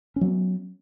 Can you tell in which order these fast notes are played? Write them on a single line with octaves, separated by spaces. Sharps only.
C#4 F#3 B3